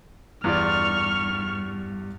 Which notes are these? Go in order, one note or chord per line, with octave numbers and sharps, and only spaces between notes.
E2 G2 F4 D5 C#6 F6